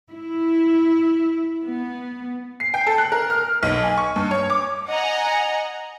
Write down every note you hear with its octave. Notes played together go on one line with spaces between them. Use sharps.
E4
B3
C7
G5
A4
F#6
A#4
F6
B1
G#5
C#6
G2
C#5
D6
D#5 F#5 G#5 A#5